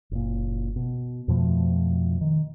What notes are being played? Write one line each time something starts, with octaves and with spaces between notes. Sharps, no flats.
F#1 A#2
B2
F2 B2 F3 A3
D#3